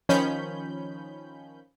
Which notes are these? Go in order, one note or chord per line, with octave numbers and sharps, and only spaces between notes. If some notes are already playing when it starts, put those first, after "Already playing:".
D#3 F3 C#4 B5 G6